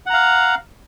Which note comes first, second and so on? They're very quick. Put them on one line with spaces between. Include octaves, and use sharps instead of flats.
F#5 A#5 F5